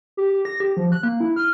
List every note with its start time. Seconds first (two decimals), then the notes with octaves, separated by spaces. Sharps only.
0.17 G4
0.29 G4
0.45 A#6
0.60 G4
0.77 F3
0.92 F#6
1.03 A#3
1.20 E4
1.36 F6